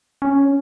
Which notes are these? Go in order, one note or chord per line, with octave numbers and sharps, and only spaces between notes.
C#4